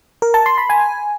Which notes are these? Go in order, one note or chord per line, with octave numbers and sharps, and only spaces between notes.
A#4
A5
C6
B5
G#5